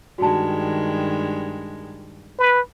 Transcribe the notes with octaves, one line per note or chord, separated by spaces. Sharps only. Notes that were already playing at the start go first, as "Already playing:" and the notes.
G2 D#3 G#3 F#4 A5
B4